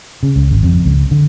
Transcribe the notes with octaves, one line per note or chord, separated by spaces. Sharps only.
C#3
C#2
G#1
F2
C#2
D3